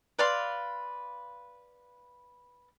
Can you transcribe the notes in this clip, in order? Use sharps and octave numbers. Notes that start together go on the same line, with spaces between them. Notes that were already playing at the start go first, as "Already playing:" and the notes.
B4 D5 F5 C6